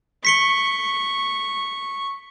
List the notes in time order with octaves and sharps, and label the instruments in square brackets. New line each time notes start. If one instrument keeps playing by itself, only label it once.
[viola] C#6 [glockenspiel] B6 C#7 G7